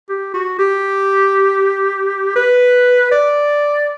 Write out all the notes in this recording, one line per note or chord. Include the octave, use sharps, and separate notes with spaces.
G4
F#4
G4
B4
D5